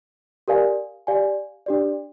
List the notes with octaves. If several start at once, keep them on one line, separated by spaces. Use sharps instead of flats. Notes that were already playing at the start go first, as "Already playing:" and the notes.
G4 A#4 D5 F5 G#5
G4 D5 F5 G#5
D4 G4 D5